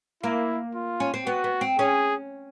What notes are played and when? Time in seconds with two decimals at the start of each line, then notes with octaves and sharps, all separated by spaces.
0.23 A#3 E4
0.75 F4
1.00 C#4
1.14 C4
1.26 B3 F#4
1.44 B3
1.61 C4
1.79 C#4 G#4